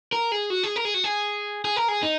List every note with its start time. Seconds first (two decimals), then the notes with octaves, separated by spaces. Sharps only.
0.12 A#4
0.32 G#4
0.50 F#4
0.63 G#4
0.76 A#4
0.85 G#4
0.94 F#4
1.04 G#4
1.65 G#4
1.76 A#4
1.88 G#4
2.03 D#4